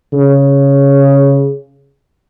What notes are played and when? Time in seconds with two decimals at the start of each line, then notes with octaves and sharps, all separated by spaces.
0.13 C#3